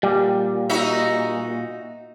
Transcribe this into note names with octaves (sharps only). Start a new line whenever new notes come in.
A#2 G3
D#4 F#4 E5